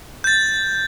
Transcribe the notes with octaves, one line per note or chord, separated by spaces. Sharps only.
G6 A6